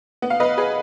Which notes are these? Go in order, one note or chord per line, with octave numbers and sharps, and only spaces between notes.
B3
F5
B4 D#5
G#4 B4